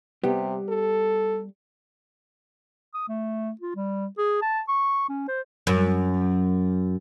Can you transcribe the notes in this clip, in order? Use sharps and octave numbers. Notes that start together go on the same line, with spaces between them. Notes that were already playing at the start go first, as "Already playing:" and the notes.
C3 G3 B3 G4
A4
D#6
A3
F4
G3
G#4
A5
C#6
C#4
C5
F#2